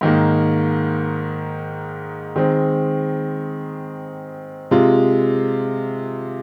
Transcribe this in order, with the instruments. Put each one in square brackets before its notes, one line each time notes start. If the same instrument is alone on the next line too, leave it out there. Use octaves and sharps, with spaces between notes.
[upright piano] G#2 D#3 A#3
D#3 G#3 C4
C3 G#3 F4